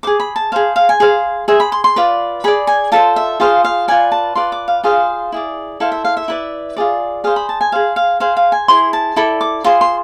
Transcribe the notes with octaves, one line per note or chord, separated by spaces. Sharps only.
G#4 C5 D6
B5
A5
G#4 C5 F5
F5
G#5
G#4 C5 F5
G#4 C5 E5
B5
C6
C6
F4 B4 D5
G#4 D5 B5
G#5
F4 A4 C5 A5
E5
F4 G#4 C5 F5
F5
F4 B4 D5 G#5
A5
F4 B4 D5 C6
D6
F5
F4 G#4 C5 F5
E4 G#4 D5
E4 A4 C5 F5
E5
F5
E5
E4 B4 D5
F4 G#4 D5
G#4 C5 F5
B5
A5
G#5
G#4 C5 F5
F5
G#4 C5 F5
F5
G#5
E4 G#4 C5 C6
A5
E4 A4 D5 B5
D6
F4 G#4 C5 C6
C6